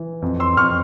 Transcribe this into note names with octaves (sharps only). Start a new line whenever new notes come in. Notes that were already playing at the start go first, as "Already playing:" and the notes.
Already playing: E3
F2
C6 E6
F2 C#6 F6